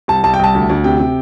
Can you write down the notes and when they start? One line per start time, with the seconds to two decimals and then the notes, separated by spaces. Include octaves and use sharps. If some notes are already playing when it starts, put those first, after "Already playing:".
0.08 C2 A5
0.24 C2 A5
0.34 G5
0.39 C2 A5
0.55 D2
0.69 D2
0.84 C3 G5
1.00 C3